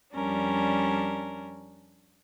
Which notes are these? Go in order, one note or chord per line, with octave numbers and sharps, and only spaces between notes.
F2 G3 C#4 D4 A#4